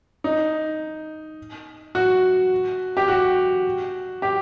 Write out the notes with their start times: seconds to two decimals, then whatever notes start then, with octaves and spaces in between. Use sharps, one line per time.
0.24 D#4
1.95 F#4
2.97 G4
3.08 F#4
4.22 G4